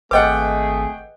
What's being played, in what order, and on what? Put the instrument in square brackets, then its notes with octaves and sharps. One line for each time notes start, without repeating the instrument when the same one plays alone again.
[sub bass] G#1 [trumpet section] A3 G#4 [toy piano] B4 D#5 [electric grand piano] F#5 G5 D6